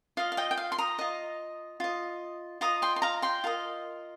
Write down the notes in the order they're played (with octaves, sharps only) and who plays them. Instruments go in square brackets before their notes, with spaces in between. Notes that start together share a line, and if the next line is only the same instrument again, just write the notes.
[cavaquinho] F4 D#5 F5
F5
D#5 G5
G5
F5
C6
A#5 D#6
F4 D#5
F4 D#5
F4 D#5 A#5 D#6
G5 C6
C6
F5 A#5
G5 C6
F4 A#4 D#5